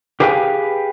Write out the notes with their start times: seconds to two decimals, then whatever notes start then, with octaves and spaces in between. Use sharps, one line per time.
0.20 G4 G#4 B4 F5 G5 G#5